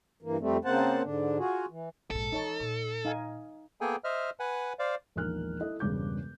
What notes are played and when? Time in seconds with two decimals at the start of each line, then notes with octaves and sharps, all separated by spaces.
0.22 G2 E3 A#3
0.40 F2 G3 A3 C4
0.65 C#3 A#3 C4 C5 F#5 A5
1.02 G#2 D3 D4
1.38 F4 F#4 G#4
1.70 E3
2.10 A#1 G#2 A4
2.32 E3 D#4 C#5 A5
2.60 A#2
3.05 D#4 F5 G#5
3.81 A#3 B3 G#4 A4 G5 G#5
4.04 C5 D#5 E5 F6
4.39 B4 F#5 G#5
4.79 C5 D5 F5
5.15 E1 A#1 D#3 A#4 F6 F#6
5.60 E4 A4 D#5
5.80 E1 G2 C#3 D6 G6